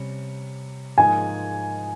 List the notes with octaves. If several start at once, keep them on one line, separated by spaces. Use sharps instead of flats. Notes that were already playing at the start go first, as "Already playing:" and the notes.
Already playing: C3 G3 C#4
G#2 F3 A#3 D#4 G#4 G#5